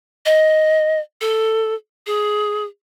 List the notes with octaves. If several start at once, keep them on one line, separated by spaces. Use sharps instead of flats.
D#5
A4
G#4